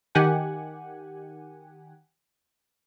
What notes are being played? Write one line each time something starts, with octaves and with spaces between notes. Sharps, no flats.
D#3 G4 F#5 G#5